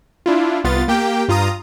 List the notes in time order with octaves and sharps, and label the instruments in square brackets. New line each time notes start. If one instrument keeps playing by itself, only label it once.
[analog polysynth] D4 E4 F4
C2 B3 F4 A6
A#3 G4 G5
G2 F4 A#5 D#6